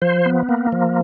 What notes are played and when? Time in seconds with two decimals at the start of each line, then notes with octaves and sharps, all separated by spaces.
0.02 F3 C5
0.26 B3
0.49 A#3
0.72 F3